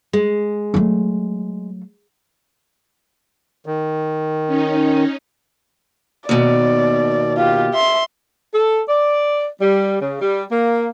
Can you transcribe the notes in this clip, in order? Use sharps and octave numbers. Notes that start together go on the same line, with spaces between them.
G#3
F#3 A3
D#3
C#4 D#4
D#2 B2 D5
F4 G4
E5 C6
A4
D5
G3
C#3
G3
A#3